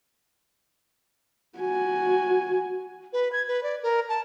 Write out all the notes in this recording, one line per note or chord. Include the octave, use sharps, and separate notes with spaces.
F#4 G#5
B4
G#6
B4
D5
A#4
A5